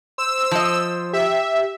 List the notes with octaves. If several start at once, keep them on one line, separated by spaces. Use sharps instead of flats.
C5 E6
F3 D#5
G4 E5